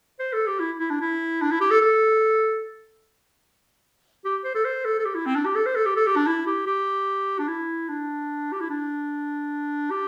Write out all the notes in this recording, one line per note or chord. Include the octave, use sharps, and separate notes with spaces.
C5
A4
G4
E4
E4
D4
E4
D4
E4
G4
A4
A4
G4
C5
A4
C5
A4
A4
G4
E4
C4
D4
G4
A4
C5
A4
G4
A4
G4
D4
E4
G4
G4
D4
E4
D4
G4
E4
D4
G4